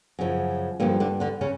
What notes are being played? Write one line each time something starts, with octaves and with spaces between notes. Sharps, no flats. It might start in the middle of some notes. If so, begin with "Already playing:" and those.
F#2 C#3 F3
G2 A#2 D3 F3 A#3
D3 D4
D3 D4
C#3 C#4